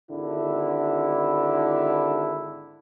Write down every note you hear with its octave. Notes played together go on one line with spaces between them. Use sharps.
G#1 D3 E4